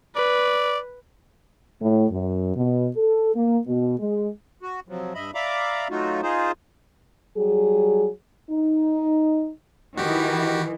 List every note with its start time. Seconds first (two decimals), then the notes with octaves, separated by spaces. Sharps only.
0.16 B4 D5
1.82 A2
2.11 F#2
2.56 B2
2.95 A4
3.35 A#3
3.67 B2
4.00 G#3
4.62 F#4
4.89 C3 F3 F#3
5.15 G2 D#5 E5 B5
5.35 D5 E5 F5 A#5 B5 D6
5.90 F#3 A3 D#4 F4 F#4
6.22 D#4 F4 G#4 C5
7.36 F#3 G3 G#4
8.51 D#4
9.98 D#3 E3 F#4 G4